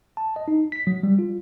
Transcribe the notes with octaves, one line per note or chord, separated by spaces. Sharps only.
A5
D#5
D#4
B6
F#3
G3
F4